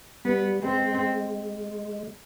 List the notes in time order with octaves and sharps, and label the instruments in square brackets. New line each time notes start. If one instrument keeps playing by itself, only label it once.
[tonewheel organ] G3 [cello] B3
[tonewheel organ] G#3 [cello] C4